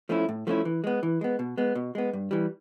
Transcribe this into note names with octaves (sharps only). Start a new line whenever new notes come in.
F3 A3 C#4 E4
A2
F3 A3 C#4 E4
E3
G#3 B3
E3
G#3 B3
B2
G#3 B3
B2
G#3 B3
G2
E3 G3